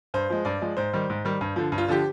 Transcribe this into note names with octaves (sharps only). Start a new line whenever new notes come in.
G2 C5
F3 G#3
G2 D5
F3 G#3
G#2 C5
D#3 G3
G#2
D#3 G3
G2
D3 F3
G2
F4
D3 F3 G4